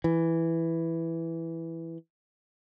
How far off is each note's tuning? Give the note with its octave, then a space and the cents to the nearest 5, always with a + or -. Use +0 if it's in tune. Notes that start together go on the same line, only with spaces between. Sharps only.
E3 +0